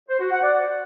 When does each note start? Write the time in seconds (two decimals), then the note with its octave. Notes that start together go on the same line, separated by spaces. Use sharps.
0.09 C5
0.20 F#4
0.31 F#5
0.42 D5